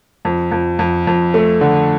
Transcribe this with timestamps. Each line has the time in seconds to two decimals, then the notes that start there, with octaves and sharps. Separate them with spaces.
0.25 F2
0.51 F2
0.79 F2
1.07 F2
1.34 A3
1.61 D3